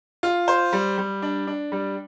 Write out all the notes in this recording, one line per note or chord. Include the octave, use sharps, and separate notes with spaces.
F4
C5
G3
G3
D4
D4
G3